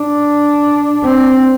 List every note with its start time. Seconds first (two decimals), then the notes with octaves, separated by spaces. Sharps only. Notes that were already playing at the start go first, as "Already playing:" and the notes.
Already playing: D4
1.04 C4